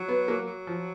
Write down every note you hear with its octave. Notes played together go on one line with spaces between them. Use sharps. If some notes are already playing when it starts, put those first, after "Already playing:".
Already playing: F#3
B3
A#3
F#3
F3